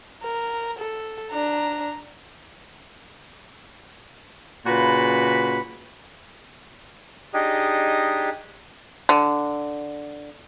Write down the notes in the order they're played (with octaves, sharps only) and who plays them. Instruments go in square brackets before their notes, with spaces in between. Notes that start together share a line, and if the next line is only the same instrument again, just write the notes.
[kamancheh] A#4
A4
D4 A#5
[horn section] A#2 C#3 F#4 B4 B5
[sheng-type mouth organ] D4 D#4 G4 G#4 D#5
[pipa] D3